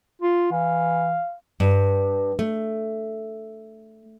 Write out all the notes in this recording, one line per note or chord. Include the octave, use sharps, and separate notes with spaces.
F4
E3 F5
G2
A3